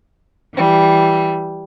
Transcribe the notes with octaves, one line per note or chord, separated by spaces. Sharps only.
E3 G3